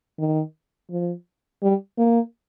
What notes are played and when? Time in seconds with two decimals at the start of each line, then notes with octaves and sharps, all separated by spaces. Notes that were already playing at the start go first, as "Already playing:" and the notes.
0.19 D#3
0.91 F3
1.63 G3
1.98 A#3